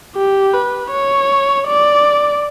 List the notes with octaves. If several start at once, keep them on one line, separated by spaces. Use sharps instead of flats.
G4
B4
C#5
D5